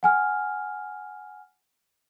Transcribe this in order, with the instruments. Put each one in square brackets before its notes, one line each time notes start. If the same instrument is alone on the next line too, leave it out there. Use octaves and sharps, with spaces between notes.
[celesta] F#5 G#5 F6